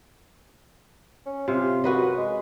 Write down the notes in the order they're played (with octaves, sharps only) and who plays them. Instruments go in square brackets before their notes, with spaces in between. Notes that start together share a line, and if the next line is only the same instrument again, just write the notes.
[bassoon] C#4
[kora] C3 [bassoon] F4
[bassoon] F#2 [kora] F#4 B4 D#5
[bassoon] G#3